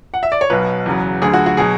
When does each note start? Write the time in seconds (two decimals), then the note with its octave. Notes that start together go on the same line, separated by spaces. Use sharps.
0.14 F#5
0.23 E5
0.32 D5
0.41 C#5
0.50 B1 B2 F#3 B4
0.86 E2 C#3 F#3
1.22 D2 D3 F#3 G#4
1.33 F#4
1.46 F#4
1.57 B2 F#3 G#4